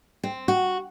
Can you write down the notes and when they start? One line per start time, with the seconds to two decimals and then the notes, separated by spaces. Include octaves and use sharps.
0.23 C4
0.48 F#4